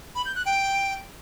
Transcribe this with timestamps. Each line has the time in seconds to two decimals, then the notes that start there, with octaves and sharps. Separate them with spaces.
0.15 B5
0.25 G6
0.36 F#6
0.46 G5